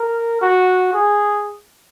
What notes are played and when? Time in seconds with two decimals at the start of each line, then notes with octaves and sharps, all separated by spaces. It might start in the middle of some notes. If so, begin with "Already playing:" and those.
Already playing: A#4
0.42 F#4
0.94 G#4